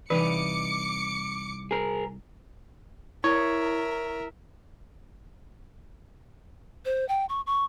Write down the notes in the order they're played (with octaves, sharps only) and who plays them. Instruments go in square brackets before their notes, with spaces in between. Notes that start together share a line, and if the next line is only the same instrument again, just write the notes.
[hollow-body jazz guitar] C2 D#4 B4 [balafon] E3 [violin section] D6 C#7
[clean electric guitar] G#4 A#4
[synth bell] E4 [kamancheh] A#4 E5 [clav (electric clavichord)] C#5
[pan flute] C5
G5
C#6
C#6